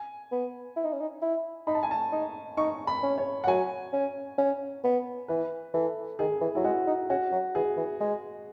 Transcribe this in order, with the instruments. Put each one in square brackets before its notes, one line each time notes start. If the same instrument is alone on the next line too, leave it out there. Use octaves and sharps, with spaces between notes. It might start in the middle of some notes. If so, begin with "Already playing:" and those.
Already playing: [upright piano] G#5
[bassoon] B3
E4
D#4
C#4
D#4
E4
[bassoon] D#4 [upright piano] B5
[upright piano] A5
G#5
A5
[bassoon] D#4
[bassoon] D#4 [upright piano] C#6
[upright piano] B5
[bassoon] C#4
[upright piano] C#5
F#5
[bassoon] F#3 [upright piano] G#5
[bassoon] C#4
C#4
B3
[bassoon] E3 [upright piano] B4
[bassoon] E3 [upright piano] A4
[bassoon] D#3 [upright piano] G#4
[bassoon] E3
[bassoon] F#3 [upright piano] E4
[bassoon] G#3 [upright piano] F#4
[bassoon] D#4
[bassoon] C#4 [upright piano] F#4
[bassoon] F#3
[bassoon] E3 [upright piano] G#4
[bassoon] E3
G#3